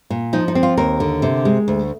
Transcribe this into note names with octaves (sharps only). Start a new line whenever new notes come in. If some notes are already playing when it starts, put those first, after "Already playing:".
A#2
F3 D#4
D#4
C4
F4
D#2 A#4
D3
C3
G#3
D2